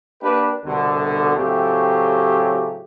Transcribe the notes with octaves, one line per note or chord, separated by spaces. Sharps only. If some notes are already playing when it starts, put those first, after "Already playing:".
A#3 D4 G4 B4
C2 B2 D3
A2 C#3 F#3 A3 C4 G4